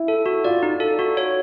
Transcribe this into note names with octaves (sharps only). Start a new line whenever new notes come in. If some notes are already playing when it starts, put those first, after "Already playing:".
Already playing: E4
A4
F#4
F4 D5
D#4
A4
F#4
C#5